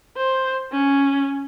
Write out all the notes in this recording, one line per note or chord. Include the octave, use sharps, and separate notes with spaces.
C5
C#4